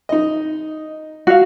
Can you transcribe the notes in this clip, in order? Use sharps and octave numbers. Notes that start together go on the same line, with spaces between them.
D#4 D#5
F#4 F5